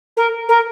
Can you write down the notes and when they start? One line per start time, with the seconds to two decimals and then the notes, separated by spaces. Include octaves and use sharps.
0.16 A#4
0.48 A#4